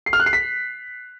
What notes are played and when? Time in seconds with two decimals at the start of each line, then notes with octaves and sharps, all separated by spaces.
0.06 C7
0.13 F6
0.20 F#6
0.26 C7
0.33 B6